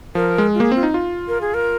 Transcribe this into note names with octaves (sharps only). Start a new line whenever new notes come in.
F3 A#4
G#3
F4
A#3 G#4
C4 F4
D#4
F4
A#4
G#4
A#4